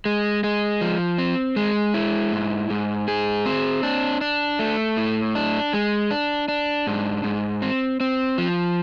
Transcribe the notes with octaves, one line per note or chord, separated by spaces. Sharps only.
G#3
G#3
F3
C4
G#3
E4
G#2
G#2
G#4
C4
D4
D4
A3
A2
D4
G#3
D4
D4
G#2
G#2
C4
C4
F3